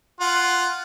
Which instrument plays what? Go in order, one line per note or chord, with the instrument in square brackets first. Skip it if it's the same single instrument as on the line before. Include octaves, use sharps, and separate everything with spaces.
[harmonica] F4 F#5